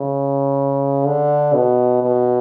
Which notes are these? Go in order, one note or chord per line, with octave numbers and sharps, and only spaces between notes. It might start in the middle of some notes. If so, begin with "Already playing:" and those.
Already playing: C#3
D3
B2
B2